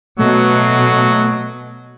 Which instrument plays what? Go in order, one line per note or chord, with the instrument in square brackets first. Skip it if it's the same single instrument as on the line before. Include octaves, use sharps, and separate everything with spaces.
[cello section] B2 [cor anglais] F#3 [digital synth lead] A3